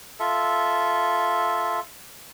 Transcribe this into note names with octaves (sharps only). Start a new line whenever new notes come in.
F4 A4 E5